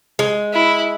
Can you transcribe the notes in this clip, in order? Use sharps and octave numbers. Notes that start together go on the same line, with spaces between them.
G#3
E4